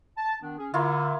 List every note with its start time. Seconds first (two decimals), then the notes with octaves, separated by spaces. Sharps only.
0.18 A5
0.42 D#3 B3 D4
0.58 C#4 G#4
0.74 D3 A#3 E4 F4